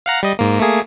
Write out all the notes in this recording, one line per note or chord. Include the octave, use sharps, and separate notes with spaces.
F5 F#5 A#5
G3 D#5
G#2 A#3
A3 A#3 G#4